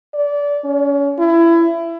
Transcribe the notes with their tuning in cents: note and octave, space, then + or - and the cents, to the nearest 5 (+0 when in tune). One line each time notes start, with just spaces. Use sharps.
D5 -25
C#4 +30
E4 +25